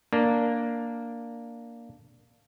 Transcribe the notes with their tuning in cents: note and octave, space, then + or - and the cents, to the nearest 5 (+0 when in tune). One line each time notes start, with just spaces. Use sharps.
A#3 +0 D4 +0